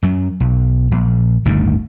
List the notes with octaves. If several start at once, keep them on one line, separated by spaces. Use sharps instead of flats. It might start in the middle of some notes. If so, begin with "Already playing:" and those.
F#2 F#3
B1
A#1
G1 D2 A2 D#3